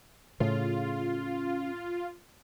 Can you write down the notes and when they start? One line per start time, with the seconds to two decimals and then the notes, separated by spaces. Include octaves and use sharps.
0.40 A2 C#3 F4